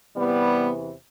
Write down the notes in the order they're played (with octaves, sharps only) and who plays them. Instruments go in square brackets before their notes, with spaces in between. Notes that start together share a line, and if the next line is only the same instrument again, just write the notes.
[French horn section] E2 C3 E3 G3 B3